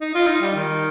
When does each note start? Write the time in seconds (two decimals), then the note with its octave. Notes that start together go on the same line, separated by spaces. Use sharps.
0.01 D#4
0.14 F4
0.27 D#4
0.41 G3
0.55 D#3